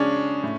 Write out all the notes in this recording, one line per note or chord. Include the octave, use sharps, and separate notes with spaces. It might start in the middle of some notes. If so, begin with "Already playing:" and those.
Already playing: C#3 G#3 C#4 D4 G#4
A2